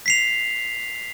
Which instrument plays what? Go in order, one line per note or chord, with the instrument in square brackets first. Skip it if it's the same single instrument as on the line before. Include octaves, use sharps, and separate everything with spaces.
[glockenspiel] B6 C7 F7